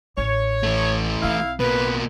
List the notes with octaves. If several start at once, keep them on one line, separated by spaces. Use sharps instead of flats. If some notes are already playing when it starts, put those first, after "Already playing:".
A1 C#5
E3 A3
B1 C4 E4 F5
B2 A#3 B4